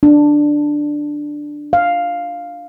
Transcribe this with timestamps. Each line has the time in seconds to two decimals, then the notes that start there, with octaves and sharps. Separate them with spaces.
0.03 D4
1.73 F5